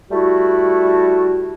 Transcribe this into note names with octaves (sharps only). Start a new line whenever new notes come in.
G3 A3 E4 F#4